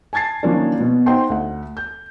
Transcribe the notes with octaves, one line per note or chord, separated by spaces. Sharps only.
G#5 A5 G#6 A6 C7
D#3 F3 F#3 A#3 C#4 D4
B2
D#4 C5 F#5 G5 C6
D2 F#5
G6